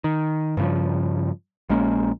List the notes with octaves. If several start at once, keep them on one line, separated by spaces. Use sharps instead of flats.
D#3
G2 C#3 F3
A#1 G#3 A#3 C#4